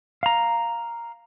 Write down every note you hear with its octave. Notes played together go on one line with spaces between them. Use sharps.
F5 A#5